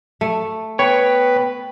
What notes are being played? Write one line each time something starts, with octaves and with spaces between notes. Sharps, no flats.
A3
B3 B4 C#5 G5